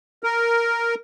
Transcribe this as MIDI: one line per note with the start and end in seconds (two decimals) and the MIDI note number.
0.24 0.95 70